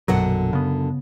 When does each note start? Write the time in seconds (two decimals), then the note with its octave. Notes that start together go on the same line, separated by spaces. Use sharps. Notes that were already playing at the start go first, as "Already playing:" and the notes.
0.08 A#1 F#2 B2 D3 F#3 F#5
0.53 C#3 B3